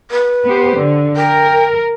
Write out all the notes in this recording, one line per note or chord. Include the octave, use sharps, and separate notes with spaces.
B4
B3 G4 C5
D3
A#4 G5